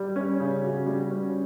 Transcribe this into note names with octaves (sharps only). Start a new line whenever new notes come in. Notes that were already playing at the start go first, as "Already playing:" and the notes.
Already playing: G3
C#4
C#3
F#4
G3
C#4